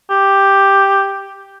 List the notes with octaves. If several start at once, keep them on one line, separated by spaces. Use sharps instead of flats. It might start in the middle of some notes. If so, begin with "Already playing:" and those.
G4